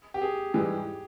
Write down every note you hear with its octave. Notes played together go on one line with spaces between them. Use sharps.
G4
G#4
G#2 E3 G3